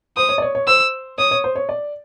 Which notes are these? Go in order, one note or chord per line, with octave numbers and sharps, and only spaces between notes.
C5 D#6
C#5
D5
C#5
C#5
C5 E6
C#5 D#6
C#5
C5
C#5
D5